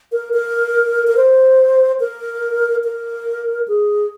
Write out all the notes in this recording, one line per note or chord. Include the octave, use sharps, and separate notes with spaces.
A#4
A#4
A#4
C5
A#4
A#4
G#4